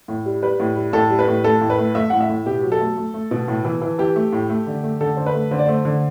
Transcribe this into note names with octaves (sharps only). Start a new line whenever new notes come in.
A2
G3
G3 B4
A2
G3
A2 A4
G3
B4
A2
A3 A4
A2
B4
A3
A3 E5
A2 F#5
E5
A2
B2 G4
F#3
A4
A3
A3
A3
B2
A2
E3
E3
E3 G4
A3
A2
A3
D3
A3
D3 A4
D3 C5
B4
A3
D3 C5
D5
A3 C5
D3